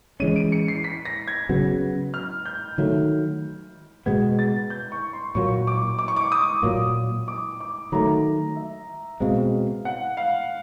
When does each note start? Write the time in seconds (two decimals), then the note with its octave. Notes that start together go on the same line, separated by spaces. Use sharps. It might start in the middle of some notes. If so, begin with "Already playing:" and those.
0.20 E3 G#3 C#4 D#7
0.36 D7
0.52 C#7
0.68 C7
0.84 B6
1.05 A#6
1.27 G#6
1.49 C#3 F#3 B3
2.14 F6
2.46 G6
2.78 D#3 F#3 A3
4.06 B2 G#3 B3 G#6
4.39 A6
4.70 G6
4.92 C#6
5.13 C6
5.35 A#2 F#3 A#3 C#6
5.67 D6
5.99 D6
6.08 C#6
6.16 D6
6.32 D#6
6.63 A#2 F#3 A#3
7.28 D6
7.60 D6
7.92 D#3 F#3 A3 A#5
8.56 E5
9.20 B2 G#3 C4 F5
9.85 F#5
10.17 F5